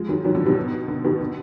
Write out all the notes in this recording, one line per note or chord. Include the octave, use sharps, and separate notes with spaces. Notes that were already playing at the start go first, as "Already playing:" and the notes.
Already playing: F3 G#3
D#3 F#3
D#3 F#3
D3 F3
B2 D#3
D3
B2 D#3
D3